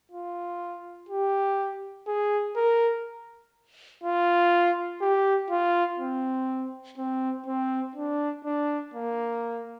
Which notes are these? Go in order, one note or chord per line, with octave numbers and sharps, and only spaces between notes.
F4
G4
G#4
A#4
F4
G4
F4
C4
C4
C4
D4
D4
A#3